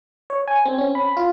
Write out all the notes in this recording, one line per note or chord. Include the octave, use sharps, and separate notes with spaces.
C#5
G#5
C4
C#4
B5
F4